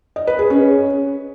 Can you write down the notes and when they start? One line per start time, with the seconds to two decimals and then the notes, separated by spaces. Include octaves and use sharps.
0.16 D#5
0.27 B4
0.39 G#4
0.50 C#4